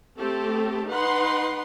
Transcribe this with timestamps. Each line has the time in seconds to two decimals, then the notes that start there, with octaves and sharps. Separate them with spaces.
0.17 A3 C4 G4 A4
0.87 D#4 B4 F#5 C6